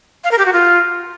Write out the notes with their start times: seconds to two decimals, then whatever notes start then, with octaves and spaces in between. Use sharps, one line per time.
0.24 F5
0.31 A#4
0.39 G4
0.46 F#4
0.53 F4